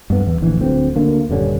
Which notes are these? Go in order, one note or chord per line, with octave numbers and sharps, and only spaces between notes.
G2 B3
E2
D1 A#1 E3
D1 D2 C4
D2 D3 A#3
D#1 G2 D3 C#4